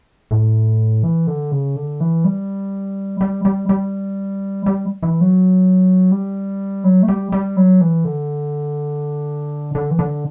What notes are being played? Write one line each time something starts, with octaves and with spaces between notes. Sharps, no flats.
A2
E3
D3
C#3
D3
E3
G3
G3
G3
G3
G3
E3
F#3
G3
F#3
A3
G3
G3
F#3
E3
D3
D3
E3
D3